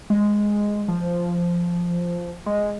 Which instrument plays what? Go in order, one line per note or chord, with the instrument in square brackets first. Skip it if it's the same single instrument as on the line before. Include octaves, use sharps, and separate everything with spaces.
[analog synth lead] G#3
F3
G#3